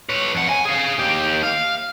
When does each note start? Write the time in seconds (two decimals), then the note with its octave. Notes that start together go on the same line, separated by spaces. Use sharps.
0.09 B4 C#5
0.35 F2 F#5
0.49 G#5
0.65 G#4 F5
0.99 D#2 G4
1.43 F5